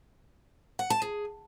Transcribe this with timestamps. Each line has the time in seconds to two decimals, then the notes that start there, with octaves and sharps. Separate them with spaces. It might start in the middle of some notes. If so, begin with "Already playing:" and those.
0.79 F#5
0.90 A5
1.02 G#4